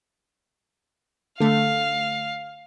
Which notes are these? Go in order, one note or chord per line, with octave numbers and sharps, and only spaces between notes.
D3 A3 A4 F5